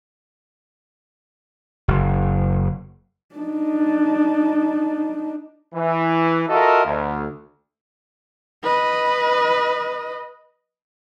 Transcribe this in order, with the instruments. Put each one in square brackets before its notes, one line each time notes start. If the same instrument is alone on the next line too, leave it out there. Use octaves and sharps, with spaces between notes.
[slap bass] F#1
[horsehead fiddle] D4 D#4
[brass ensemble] E3
F4 F#4 A4 A#4 D#5 E5
D2
[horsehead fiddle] B4 D#5